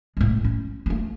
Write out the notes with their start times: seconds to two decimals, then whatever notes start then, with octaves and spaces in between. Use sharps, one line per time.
0.17 A2 G#3
0.44 C#4
0.86 A3 A#3